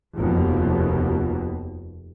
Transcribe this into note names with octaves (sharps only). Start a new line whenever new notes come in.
F1 D#2 B2